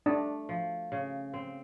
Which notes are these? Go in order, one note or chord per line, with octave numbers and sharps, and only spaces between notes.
A3 D4
F3
C#3
C4